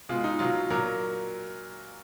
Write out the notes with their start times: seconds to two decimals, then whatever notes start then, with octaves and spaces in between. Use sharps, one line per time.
0.09 B2 G#3 F4
0.24 D#4
0.39 B2 F#3 F4
0.70 A#2 F#3 A#4